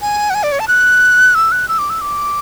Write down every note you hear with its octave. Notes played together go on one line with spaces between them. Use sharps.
G#5
F#5
G#5
D5
C#5
A5
F#6
E6
F#6
E6
D6
E6
D6